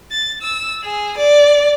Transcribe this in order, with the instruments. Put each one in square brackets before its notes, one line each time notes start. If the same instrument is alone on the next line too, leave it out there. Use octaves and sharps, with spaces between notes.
[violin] A6
E6
G#4
D5